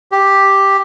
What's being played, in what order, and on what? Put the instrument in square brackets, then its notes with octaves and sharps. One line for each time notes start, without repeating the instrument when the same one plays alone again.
[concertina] G4